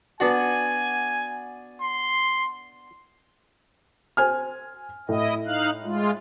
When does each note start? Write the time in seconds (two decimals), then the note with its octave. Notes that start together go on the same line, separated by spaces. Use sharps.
0.20 B3 D4 F#4 G#5
1.81 C6
4.17 C5 G#5 F6
5.09 A2 E4 D#5
5.46 D#4 F5 F#6
5.84 G#3 F4